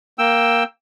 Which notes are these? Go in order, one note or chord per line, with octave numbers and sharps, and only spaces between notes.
A#3 G5 E6